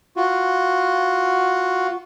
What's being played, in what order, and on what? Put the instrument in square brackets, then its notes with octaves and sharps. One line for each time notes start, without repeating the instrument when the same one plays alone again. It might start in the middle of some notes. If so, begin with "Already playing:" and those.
[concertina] F4 F#4